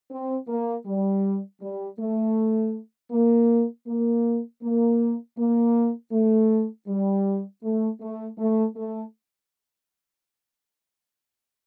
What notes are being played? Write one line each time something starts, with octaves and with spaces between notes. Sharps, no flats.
C4
A#3
G3
G3
A3
A#3
A#3
A#3
A#3
A3
G3
A3
A3
A3
A3